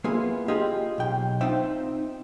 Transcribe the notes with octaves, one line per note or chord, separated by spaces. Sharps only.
A#3 B3 E4 F4 G#4
F4 G4 G#4 D#5
B1 G5
C4 D#4 F4 C5 E5 G5